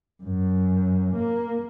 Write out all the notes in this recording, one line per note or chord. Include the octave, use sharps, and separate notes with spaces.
F#2
A#3